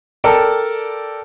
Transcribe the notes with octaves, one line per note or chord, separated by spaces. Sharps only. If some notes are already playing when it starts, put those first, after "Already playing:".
A4 A#4 D5 G5 A5